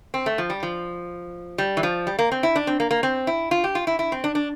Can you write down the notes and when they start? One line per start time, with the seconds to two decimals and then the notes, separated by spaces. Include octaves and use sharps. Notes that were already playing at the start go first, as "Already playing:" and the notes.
0.14 C4
0.26 A3
0.38 F3
0.50 G3
0.63 F3
1.58 G3
1.77 E3
1.83 F3
2.07 G3
2.19 A#3
2.32 C4
2.43 E4
2.56 D4
2.67 C4
2.80 A#3
2.91 A#3
3.03 C4
3.27 E4
3.51 F4
3.64 G4
3.75 F4
3.87 E4
3.99 E4
4.12 C4
4.24 D4
4.35 D4